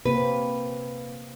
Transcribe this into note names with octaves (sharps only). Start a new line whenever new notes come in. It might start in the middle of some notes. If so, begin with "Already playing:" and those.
C3 A#3 C4 B4